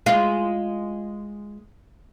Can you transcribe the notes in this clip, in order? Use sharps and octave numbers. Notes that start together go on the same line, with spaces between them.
G#3 F4